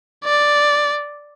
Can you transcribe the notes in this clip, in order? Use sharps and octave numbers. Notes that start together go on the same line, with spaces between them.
D5